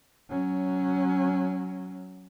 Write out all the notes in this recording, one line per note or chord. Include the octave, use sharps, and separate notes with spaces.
F#3 C#4